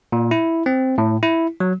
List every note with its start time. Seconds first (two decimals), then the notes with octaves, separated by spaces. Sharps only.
0.12 A#2
0.31 E4
0.66 C4
0.98 A2
1.23 E4
1.60 F#3